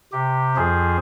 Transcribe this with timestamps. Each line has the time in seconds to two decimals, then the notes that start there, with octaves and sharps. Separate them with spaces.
0.12 C3 G4
0.56 F2 F3 G#4 C5